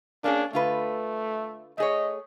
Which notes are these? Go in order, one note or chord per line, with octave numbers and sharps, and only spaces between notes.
A#3 C#4 D4 G#4
D3 A3 F4 B4
A3 G#4 C#5 D#5